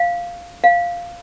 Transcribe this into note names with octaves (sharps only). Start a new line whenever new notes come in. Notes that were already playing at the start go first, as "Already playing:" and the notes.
Already playing: F5
F5